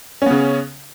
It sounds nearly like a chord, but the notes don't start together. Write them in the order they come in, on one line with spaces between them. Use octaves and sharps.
C#4 B3 C#3